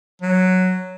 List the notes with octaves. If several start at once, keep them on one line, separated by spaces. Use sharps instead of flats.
F#3